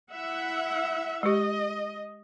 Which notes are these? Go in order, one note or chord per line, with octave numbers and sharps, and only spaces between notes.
E4 E5 F#5
G#3 G4 D#5